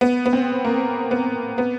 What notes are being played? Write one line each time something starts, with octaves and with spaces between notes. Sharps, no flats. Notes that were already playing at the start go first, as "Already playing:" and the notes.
B3
B3
C4
A#3
B3
B3